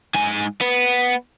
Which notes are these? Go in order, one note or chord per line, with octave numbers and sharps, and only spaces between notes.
G#2 G#5
B3